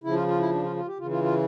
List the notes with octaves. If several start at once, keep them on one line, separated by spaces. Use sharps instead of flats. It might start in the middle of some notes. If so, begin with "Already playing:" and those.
C#3 F3 E4
F4
F4
E4
D4
F4
F4
G4
C#3 E3 F4
F4
F4